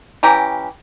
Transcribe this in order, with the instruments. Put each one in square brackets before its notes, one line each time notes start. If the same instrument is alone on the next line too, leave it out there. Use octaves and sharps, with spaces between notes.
[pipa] E3 C#4 G4 A#5